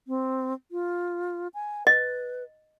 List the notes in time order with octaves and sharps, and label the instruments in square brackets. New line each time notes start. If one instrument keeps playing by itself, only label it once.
[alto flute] C4
F4
G#5
[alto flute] B4 [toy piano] D#5